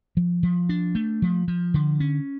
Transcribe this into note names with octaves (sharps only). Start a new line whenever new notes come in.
F3
F3
D4
A3
F3
F3
D3
C#4